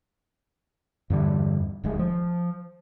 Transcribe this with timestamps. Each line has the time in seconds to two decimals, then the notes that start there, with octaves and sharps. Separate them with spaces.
1.10 E2 G2 D3 G3
1.84 D1 D#2 G#3
1.99 F3